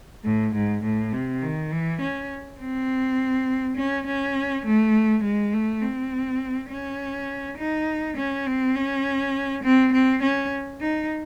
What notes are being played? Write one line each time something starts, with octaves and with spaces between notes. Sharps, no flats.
A2
G#2
A2
C3
D#3
E3
C#4
C4
C#4
C#4
A3
G#3
A3
C4
C#4
D#4
C#4
C4
C#4
C4
C4
C#4
D#4